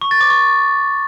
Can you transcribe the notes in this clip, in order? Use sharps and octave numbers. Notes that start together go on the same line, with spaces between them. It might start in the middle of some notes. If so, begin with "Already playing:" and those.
C#6
A6
D6
C#6